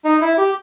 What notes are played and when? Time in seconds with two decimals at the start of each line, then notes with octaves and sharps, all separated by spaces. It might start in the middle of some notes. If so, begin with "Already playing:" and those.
0.05 D#4
0.21 E4
0.38 G4